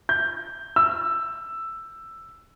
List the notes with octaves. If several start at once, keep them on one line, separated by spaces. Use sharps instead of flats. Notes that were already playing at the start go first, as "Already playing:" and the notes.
G6
E6